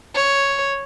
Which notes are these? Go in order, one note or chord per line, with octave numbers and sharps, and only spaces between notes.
C#5